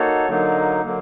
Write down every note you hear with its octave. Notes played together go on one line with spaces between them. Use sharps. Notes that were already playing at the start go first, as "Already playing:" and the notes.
Already playing: A#3 D#4 F#4 A4 C#5
D3 F#3 A#3 D#4
D3 F#3 A#3